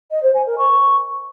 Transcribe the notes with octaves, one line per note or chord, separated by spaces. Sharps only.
D#5
C5
G#5
A#4
C#6